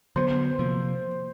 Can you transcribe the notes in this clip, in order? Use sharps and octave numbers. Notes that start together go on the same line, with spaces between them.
D3 F#3 B3 C5
C3 F3 A#3